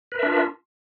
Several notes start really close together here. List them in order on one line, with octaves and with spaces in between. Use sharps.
B4 A#4 E5 D4 F4